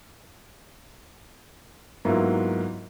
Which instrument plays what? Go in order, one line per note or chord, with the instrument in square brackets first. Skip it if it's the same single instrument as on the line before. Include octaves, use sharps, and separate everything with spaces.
[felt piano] G#2 F#3 A#3 B3 E4 F4